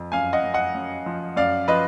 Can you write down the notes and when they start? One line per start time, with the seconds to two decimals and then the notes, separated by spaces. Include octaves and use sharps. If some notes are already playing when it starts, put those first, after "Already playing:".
Already playing: F2
0.12 F#2 F5 G#5
0.33 D#5 F#5
0.43 F#2
0.54 D#5 F#5
0.74 F#2
1.06 F3
1.36 F#2 D5 F5
1.68 F3 B4 D#5